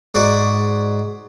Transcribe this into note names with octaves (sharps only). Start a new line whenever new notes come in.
G#2 F#4 D5